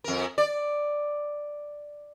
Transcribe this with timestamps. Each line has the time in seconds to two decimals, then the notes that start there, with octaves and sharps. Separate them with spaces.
0.04 F2 A#4
0.38 D5